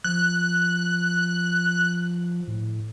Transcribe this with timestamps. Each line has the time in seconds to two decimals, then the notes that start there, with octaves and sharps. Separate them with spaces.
0.04 F3 F#6
2.48 A2